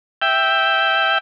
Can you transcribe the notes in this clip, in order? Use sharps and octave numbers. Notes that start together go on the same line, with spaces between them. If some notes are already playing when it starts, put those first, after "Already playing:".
E5 G5